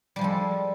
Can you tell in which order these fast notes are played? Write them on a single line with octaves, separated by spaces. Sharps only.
G3 F3 G#3 A4